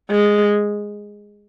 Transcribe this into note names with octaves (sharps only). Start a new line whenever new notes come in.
G#3